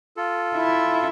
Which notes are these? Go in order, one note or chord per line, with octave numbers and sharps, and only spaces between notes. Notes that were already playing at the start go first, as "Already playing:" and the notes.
F4 A4
E4